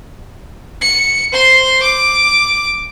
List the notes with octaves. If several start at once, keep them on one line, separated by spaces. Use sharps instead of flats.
C#7
C5 C6
D6